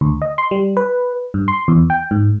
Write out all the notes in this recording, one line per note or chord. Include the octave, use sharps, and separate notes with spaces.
D2
D#5
C6
G3
B4
G2
C6
E2
G5
G#2